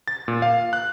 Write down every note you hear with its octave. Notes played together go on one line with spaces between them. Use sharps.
A6
A#2
F5
F#6